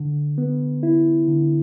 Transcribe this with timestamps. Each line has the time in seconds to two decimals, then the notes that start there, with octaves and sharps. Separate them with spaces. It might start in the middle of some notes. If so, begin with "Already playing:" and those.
Already playing: D3
0.38 B3
0.83 E4
1.28 D3